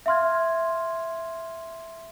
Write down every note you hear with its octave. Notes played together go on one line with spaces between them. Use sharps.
E5 F5 C6 F6 G#6